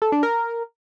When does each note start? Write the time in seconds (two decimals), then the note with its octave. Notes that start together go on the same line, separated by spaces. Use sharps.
0.02 A4
0.12 D4
0.23 A#4